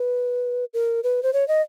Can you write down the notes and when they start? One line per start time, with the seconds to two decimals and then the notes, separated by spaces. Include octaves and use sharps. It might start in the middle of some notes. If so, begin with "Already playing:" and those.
Already playing: B4
0.74 A#4
1.03 B4
1.23 C5
1.33 C#5
1.48 D#5